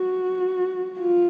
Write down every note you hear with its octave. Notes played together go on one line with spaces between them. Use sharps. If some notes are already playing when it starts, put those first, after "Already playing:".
Already playing: F#4
F4